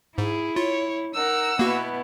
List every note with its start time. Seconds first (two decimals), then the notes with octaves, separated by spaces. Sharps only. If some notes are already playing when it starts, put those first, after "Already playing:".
0.18 G#2 E4 G#4
0.56 F4 C#5
1.15 D#4 A#4 F#5 E6
1.59 B2 A#3 B3 E4 F#4